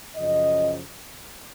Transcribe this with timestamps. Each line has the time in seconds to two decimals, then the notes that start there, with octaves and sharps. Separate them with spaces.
0.16 F#2 C#3 F3 D#5